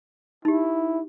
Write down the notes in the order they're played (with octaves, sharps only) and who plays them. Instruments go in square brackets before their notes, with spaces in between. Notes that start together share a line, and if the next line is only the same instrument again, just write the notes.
[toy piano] D#4 G4 [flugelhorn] E4